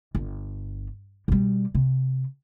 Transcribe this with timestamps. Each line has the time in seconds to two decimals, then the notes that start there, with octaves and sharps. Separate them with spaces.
0.15 G1
1.28 B2 G3
1.75 C3